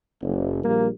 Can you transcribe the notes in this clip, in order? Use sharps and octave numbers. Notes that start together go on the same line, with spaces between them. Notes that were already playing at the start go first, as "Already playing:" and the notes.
F#1
A#1 G3 A#3 G4 A#4